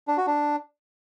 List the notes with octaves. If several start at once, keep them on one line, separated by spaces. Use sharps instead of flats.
D4
F#4
D4